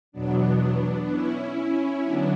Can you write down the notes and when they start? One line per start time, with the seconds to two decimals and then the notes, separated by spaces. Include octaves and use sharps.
0.12 E2 B2 F#3 B3 D4
1.08 C#4 E4
2.03 D3 F#3 B3 D4